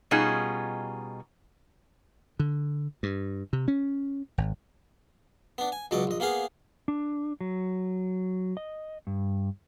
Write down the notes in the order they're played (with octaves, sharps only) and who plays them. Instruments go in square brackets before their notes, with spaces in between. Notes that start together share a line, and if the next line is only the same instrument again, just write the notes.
[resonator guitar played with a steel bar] B2 G3 C#4 D#4 F4 G#4
[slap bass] D3
G2
C3
C#4
G#1
[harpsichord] B3 D4
G#5
C#2 B2 F#3 D5 D#5
A#1 D#5
A#3 B3 G#4 F5
[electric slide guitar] D4
F#3
D#5
G2